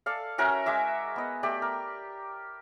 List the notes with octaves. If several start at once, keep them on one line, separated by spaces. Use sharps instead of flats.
A4 D5 F5
C#4 F#4 A#4 E5
G#3 G#4 E5 D6
B3 D#5
A3 G4 D5
A#4